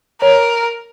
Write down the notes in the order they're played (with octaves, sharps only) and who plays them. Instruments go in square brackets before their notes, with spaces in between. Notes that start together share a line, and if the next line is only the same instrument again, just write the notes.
[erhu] A#4 [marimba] C#5